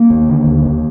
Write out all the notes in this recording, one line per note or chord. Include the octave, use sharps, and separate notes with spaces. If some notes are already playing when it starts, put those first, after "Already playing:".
Already playing: A#3
D#2
D3
D#2
D#2